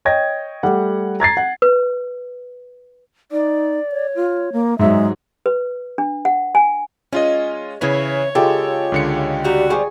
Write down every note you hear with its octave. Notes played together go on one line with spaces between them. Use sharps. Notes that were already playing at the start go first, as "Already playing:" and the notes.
C#5 D#5 G5 G#6 A#6
G3 A3 F#5
A#5 G#6 A6 C7
F#5
B4
D#4 D5
C#5
F4
A#3
G#2 F#3 G#3 E5
B4
D4
F#5
G#5
G#3 C#4 F4 D#5
C#3 E3 C#4 E4 B4 C#5 G#5
C#3 G#3 F4 G4 A4
C#2 D3 C#7
G3 F#4 G5 A#5
G3 C4 F4 G#4 G#5 C#6